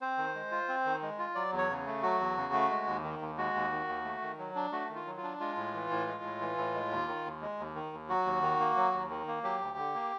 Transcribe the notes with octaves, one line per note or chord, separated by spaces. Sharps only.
C4 C5
D#3
G#3
F4
C4
D#3
G#3
F4
F#3 D5
E2
C#5
C#3
A3
F#3 F#4
E2
C#3
A3
G#3
D#2
D#3
D#2
G#3 F#4
D#2
D#3
D#2
A3
D#3
F#3
D4
A3 F#4
D#3
F4
F#3
F4
D4
G#3 F4
A2
E3
A2
G#3
A2
E3
A2
G#3
D#2
D#3
D#2
G#3
D#2
D#3
D#2
F#3 F#4
D#2
D#3
A#3
F#3
D#2
D#3
A#3
F#3 G4
D2
D3
A#3